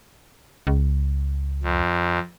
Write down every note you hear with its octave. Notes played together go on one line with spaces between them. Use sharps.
C#2
F2